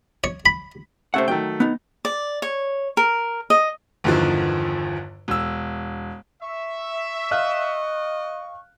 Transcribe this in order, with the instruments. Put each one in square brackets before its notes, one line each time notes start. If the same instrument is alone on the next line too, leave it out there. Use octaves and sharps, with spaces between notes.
[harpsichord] C#5
B5
[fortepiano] C3 A3 C#4 [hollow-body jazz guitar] C5 E5 F#5
[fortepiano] D#3 F#3 A3 [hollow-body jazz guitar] G5
[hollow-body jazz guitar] B3 D#4
[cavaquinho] D5
C#5
A#4
D#5
[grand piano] G1 E2 D3 D#3 F3
E1 E6
[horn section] E5 [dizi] C#6
[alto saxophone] D#5 [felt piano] F5 F6 F#6